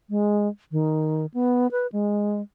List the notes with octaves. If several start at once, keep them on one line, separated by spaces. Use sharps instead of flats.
G#3
D#3
B3
B4
G#3